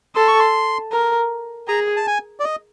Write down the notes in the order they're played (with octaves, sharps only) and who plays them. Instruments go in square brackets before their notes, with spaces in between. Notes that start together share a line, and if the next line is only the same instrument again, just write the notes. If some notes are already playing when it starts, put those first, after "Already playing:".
[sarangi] A4 [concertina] C6
[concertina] C#6
C6
[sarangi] A#4
[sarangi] G#4 [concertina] A#5
[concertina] A5
G#5
D5
D#5